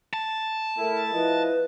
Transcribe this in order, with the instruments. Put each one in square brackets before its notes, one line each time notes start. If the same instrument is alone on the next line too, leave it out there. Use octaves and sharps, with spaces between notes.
[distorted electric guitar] A5
[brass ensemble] A3 E4 [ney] A#4
[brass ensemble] F3 E4 D#5 [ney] B4